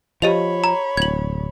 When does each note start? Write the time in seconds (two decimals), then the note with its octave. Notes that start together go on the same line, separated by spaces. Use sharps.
0.22 F3 G4 C#5 D#5 B5 F7
0.64 A#5
0.97 D1 G#6 F#7